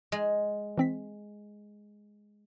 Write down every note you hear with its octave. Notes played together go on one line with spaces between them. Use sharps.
G#3
E3 C4 B6